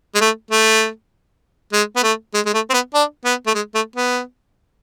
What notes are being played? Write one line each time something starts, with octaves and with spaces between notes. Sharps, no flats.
G#3
A3
A3
G#3
B3
A3
G#3
G#3
A3
C4
B3
D4
B3
A3
G#3
A3
B3